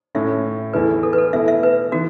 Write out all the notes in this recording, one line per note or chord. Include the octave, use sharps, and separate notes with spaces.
A2 A3 C#4 E5
E2 E3 A3 E4 B4
A4
B4
A4
B2 A3 E4 E5
E5
B4
E3 B3 F#4